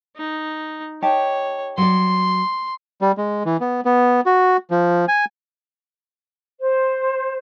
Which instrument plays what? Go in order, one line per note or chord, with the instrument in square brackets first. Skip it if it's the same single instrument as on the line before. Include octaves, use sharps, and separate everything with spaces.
[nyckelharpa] D#4
[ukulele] D#4 G4 A5 [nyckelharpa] C#5
[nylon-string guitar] F#3 D5 [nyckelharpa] C6
[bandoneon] G3
G#3
E3
B3
B3
F#4
F3
G#5
[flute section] C5